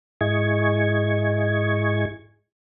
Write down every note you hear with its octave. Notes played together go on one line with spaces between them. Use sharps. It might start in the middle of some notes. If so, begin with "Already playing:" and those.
G#2 E4 G#4 D#5 C#6 G#6